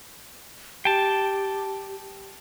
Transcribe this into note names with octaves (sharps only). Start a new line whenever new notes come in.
G4 G5 A5